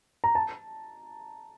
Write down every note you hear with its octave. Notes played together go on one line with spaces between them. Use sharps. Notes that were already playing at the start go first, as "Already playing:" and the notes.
A#5
A5